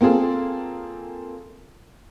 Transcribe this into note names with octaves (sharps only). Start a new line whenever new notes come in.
A#3 C4 F4 G#4 A4